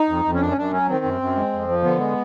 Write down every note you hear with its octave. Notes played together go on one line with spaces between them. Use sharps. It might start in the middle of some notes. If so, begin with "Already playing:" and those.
Already playing: D#4
F2
F2
C#4
F#2 D4
C#4
F#2 D4
F#3 C#4
D#3 C4
F#2
F#2
G#3
F2
F3
D3 B3
G#3